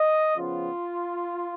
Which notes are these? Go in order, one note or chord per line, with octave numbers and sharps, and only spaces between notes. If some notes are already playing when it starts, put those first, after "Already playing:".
Already playing: D#5
C#3 F3 B3 F4